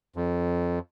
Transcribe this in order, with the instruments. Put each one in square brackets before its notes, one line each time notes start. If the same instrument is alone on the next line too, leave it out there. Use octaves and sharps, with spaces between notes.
[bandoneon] F2